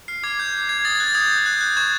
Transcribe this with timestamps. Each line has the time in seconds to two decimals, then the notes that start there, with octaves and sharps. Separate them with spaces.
0.08 F6 C7
0.23 D6 G#6
0.39 G6
0.54 G6
0.69 G6 G#6
0.85 D#6 A6
0.95 A6
1.00 F#6 G#6
1.15 D#6 G6
1.30 D#6
1.46 F#6
1.61 F#6
1.77 C#6 G#6